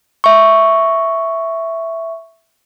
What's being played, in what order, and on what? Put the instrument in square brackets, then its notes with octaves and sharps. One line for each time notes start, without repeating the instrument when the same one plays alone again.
[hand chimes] E5 C#6